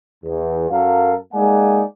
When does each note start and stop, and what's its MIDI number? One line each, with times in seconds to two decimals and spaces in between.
0.24 0.69 40
0.70 1.14 42
0.70 1.14 54
0.70 1.14 69
0.70 1.14 70
0.70 1.14 77
1.34 1.82 56
1.34 1.82 58
1.34 1.82 63
1.34 1.82 74
1.34 1.82 78
1.34 1.82 80